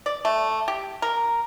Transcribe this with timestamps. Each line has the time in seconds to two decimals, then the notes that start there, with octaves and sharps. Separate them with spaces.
0.06 D5
0.25 A3
0.68 G4
1.02 A#4